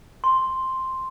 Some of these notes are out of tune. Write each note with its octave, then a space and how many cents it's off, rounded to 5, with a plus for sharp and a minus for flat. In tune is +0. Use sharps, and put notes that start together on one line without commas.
C6 +0